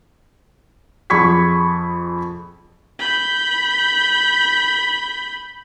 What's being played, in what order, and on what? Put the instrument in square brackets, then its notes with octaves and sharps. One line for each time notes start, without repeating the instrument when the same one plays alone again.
[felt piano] F2 G#4 B5 C#6 G#6 B6
[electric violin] B5 G6